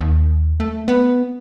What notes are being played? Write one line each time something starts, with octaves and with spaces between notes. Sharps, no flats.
D#2
A3
B3